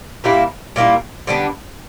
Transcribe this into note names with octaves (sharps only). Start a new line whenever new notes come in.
A#2 G3 A#3 E4
A#2 G3 A#3 E4
D3 G3 B3 D4